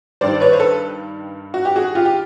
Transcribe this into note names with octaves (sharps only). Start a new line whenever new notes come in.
G2 D#3 G3 C5 D5
B4 C#5
C5
A4 B4
F#4
G4
F#4 G#4
F4 G4
G4